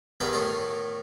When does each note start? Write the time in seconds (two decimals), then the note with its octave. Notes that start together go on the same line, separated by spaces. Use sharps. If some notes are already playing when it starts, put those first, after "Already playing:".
0.20 E2 G2 D#3 D#4 B4 A#5
0.33 A2 D#3 F4 A#5